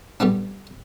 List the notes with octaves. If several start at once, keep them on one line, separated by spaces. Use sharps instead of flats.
G3 A3 B3 D4